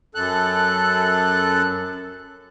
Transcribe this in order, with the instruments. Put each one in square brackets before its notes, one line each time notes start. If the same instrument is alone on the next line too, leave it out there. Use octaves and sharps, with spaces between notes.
[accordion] F#2 A4 F#6